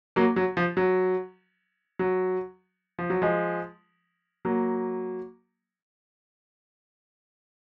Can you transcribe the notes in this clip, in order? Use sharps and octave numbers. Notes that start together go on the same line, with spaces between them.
F#3 A#3
F#3
F3
F#3
F#3
F3
F#3
F3 G#3
F#3 A#3